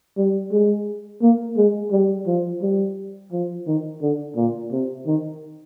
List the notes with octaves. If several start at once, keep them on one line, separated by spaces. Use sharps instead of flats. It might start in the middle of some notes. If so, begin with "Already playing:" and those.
G3
G#3
A#3
G#3
G3
F3
G3
F3
D#3
D3
A#2
C3
D#3